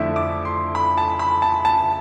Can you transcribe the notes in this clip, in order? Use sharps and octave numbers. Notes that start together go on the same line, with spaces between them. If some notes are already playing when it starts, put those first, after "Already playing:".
Already playing: F2 D3 A3 E4 E5
D6
C6
B5
A5
B5
A5
A5